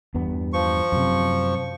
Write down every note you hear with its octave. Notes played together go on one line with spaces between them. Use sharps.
E2 G2 B3
F3 C#6
F#2 C3